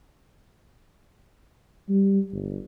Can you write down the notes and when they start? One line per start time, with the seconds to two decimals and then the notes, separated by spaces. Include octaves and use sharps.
1.89 G3
2.32 G1